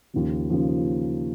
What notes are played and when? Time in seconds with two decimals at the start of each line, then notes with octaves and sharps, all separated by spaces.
0.14 D#2 C#3 F3
0.50 D#2 C#3 F3